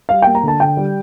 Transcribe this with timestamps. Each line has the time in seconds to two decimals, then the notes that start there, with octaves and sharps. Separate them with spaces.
0.09 G3 F5
0.22 A#3 G5
0.35 A#5
0.43 D3 A5
0.60 D3 G5
0.77 G3